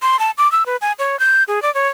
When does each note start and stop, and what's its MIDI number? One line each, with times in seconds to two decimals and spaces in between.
0.02 0.19 84
0.19 0.31 81
0.38 0.50 86
0.52 0.66 88
0.66 0.77 71
0.81 0.92 80
0.99 1.19 73
1.19 1.44 91
1.48 1.62 68
1.62 1.73 74
1.74 1.88 73